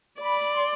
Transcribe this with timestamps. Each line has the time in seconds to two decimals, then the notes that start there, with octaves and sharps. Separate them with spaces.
0.21 D5 B5
0.54 C6